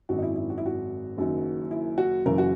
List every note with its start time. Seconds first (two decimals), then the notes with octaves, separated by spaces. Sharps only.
0.09 G#1 F#2 D#3 F#3 F#4
0.18 D#4
0.23 E4
0.36 E4
0.50 F#4
0.58 E4
0.66 F#4
1.17 F#1 F#2 D#3 F#3
1.71 E4
1.98 F#4
2.25 F#1 F#2 C#3 E3 A#4
2.38 F#4